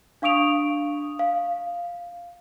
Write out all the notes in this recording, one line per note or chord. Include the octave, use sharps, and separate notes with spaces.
D4 F5 C#6 D#6 D7 F7
F5